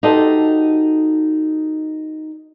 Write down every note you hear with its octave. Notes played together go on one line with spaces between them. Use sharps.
D#4 F#4 G4 A4 C5 D#5